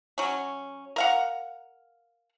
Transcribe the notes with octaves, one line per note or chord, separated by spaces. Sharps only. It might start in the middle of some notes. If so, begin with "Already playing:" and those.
F#3 C#4
A#4 F5 F#5